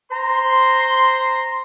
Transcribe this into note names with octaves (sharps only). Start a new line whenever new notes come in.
C5 A#5 C6